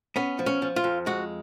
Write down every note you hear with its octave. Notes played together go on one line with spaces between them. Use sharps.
B3 C#4
F3
C#4
F3
F4
F2
G#3 F#4